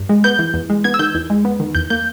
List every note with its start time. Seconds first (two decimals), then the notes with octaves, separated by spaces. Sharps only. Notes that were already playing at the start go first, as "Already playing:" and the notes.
Already playing: G2
0.09 G#3
0.24 B3 G6
0.39 E3
0.54 E2
0.70 G#3
0.84 B3 G#6
0.94 E6
0.99 D#3 G6
1.14 E2
1.30 G#3
1.45 B3
1.60 D#3
1.75 E2 G6
1.90 A#3 G6